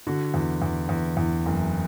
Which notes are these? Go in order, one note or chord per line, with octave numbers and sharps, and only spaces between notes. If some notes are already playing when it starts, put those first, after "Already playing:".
D3 F#4
E2
E2
E2
E2
F#1